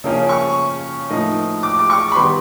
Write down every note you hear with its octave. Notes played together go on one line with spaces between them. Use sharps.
C#3 F3 A#3 C#4
C#6
A2 F3 A#3 D#4
D6
D6
C#6
B5
D#3 G3 B3 C6